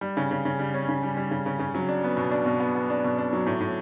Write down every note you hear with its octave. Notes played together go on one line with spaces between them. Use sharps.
G3
C#3
C#3
C#3
G3
C#4
C#3
G3
G3
C#3
C#3
C#3
F#3
D4
B3
B2
D4
B2
B3
B3
D4
B2
D4
F#3
A2
A2